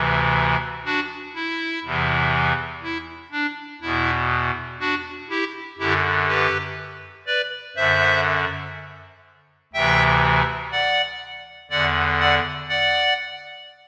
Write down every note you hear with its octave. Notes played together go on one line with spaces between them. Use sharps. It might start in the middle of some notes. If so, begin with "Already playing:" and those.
Already playing: D2 C3 E3
D4 F#4
E4
E2 C3 E3
E4
D4
E2 B2 E4
D4 F#4
E4 G4
F#2 D3 E4 G4
G4 B4
B4 D5
F#2 D3 C5 E5
D2 C3 E3 E5 G5
D5 F#5
E2 D3 D5 F#5
D5 F#5
D5 F#5